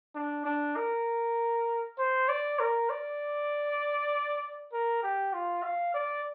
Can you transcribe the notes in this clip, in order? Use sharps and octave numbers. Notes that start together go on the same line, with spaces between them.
D4
D4
A#4
C5
D5
A#4
D5
A#4
G4
F4
F5
D5